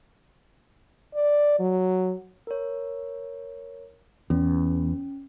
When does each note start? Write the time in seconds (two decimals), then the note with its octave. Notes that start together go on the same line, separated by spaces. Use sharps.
1.14 D5
1.59 F#3
2.47 A#4 C#5
4.30 E2 C#4